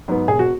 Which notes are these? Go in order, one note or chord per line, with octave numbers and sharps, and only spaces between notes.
G#2 F#3 B3
E1 G#4
F#4